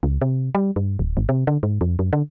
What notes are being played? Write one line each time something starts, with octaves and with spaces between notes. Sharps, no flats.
C#2
C3
G3
G2
D1
G#1
C3
D3
G#2
F2
F#2
D3